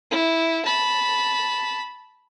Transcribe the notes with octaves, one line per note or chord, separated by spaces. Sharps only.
E4
A5 B5